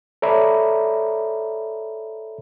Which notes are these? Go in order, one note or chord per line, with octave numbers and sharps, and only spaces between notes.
A4 C#5 D5 E5 A#5 B5